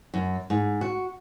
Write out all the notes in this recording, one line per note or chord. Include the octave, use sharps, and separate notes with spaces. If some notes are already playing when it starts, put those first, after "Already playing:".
F#2
G#2
F#4